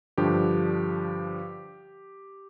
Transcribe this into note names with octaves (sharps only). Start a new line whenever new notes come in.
G2 D3 F3 G4